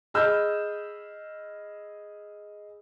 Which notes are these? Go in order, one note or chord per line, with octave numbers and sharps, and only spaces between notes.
G#4 D#5 B5 E6 F6 G6